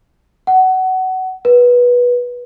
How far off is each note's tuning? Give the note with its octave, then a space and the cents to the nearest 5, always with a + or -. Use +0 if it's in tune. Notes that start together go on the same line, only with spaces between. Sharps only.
F#5 +20
B4 -15